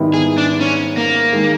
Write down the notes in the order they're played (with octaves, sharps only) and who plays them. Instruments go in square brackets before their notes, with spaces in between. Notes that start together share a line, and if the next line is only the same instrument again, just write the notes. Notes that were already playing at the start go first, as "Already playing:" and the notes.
Already playing: [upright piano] G#2 D#3 G3 B3 E4
[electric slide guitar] G#4
D4
C#4
A#3
[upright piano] D#3 G#3